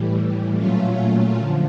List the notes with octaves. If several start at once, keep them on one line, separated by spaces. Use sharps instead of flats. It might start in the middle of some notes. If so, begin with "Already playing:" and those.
Already playing: A2 E3 G3
A#2 F#3 A3 C#4 F4
D3 F3